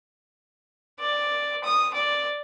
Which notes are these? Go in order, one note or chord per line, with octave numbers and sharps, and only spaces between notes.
D5
D#6
D5